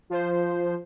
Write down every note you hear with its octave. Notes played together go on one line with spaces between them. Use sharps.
F3 C5